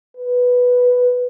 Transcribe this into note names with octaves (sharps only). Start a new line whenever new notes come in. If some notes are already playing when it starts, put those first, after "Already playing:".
B4